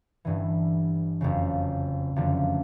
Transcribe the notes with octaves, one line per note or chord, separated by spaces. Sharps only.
G1 G2 E3
F#1 F2 C#3
F#1 F2 D3 F3 A3